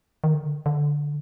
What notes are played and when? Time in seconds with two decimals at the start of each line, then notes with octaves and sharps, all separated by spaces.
0.24 D#3
0.34 D3
0.66 D3